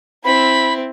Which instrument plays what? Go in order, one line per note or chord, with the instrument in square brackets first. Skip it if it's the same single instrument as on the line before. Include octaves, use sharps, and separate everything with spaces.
[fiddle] C4 E4 [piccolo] B5